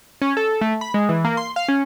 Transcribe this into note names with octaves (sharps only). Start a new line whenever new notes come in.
C#4
A4
A3
B5
G#3
E3
A#3
C6
F5
C#4